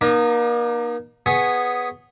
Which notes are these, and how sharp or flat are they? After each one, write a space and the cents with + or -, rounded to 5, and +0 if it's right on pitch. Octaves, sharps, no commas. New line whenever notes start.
A#3 +35 D#4 -25
B3 +0 G#4 +0 C#5 -15